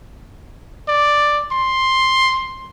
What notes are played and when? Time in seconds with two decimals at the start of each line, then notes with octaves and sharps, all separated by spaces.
0.88 D5
1.52 C6